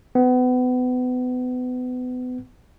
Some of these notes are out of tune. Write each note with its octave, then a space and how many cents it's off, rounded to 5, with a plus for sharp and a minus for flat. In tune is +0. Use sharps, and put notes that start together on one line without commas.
B3 +30